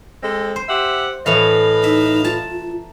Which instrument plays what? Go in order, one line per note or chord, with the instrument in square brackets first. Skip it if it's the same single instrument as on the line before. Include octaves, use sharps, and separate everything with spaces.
[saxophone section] G#3 C4 A4
[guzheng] C5
[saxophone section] G4 E5 F#5
[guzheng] A2 E3 A3 [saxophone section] B4 D#5 F5
[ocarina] D#4 [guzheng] E5
[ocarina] F4 [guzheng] A5 A#5